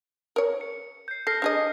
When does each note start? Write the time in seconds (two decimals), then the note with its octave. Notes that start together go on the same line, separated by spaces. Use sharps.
0.36 A#4 C#5
0.61 C#7
1.08 G6 C7
1.27 A4 F6 A#6 C7
1.42 D4 G#4 D#5